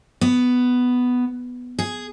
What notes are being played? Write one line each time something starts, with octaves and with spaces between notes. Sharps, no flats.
B3
G#4